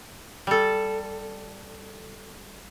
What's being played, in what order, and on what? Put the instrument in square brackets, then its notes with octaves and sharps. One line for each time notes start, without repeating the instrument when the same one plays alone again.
[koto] G3 A4